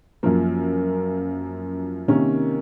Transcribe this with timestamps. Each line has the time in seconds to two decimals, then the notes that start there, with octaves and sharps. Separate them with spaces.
0.23 F#2 F3 A#3
2.08 C3 D#3 A#3 C#4